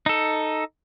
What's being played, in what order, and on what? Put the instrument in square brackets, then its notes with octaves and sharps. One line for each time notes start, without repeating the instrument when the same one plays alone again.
[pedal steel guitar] D#4 A4